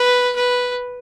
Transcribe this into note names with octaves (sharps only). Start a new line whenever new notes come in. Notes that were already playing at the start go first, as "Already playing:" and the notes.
Already playing: B4
B4